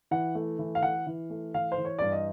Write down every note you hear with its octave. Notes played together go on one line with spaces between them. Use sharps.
E3 F#5
A3
E3
F5
E3 F#5
E3
A3
E3 F5
C5
E3
C#5
G2 D5
D#5